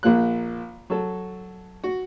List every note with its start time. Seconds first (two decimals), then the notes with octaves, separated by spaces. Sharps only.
0.03 A#1 A#2 A#3 F#6
0.90 F#3 A4
1.84 F#4